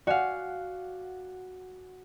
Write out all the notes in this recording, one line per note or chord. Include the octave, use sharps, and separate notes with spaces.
F#4 D5 F5 F#5 G#5